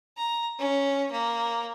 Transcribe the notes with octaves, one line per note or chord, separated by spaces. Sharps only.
A#5
C#4
A#3